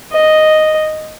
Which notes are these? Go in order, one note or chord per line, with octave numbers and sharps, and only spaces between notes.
D#5